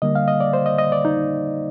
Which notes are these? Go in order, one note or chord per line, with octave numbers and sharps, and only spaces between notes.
D3 G3 A#3 D#5
F5
D#5
D5
C5
D#5
D#5
D5
D#4